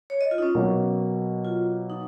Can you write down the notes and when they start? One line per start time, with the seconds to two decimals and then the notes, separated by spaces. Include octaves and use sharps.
0.10 C#5
0.21 D#5
0.31 F4
0.38 D#4
0.43 C#4
0.55 B2 F#3 A#3
1.45 F4
1.90 D#4